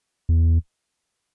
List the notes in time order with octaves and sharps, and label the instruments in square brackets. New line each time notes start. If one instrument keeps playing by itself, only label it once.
[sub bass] E2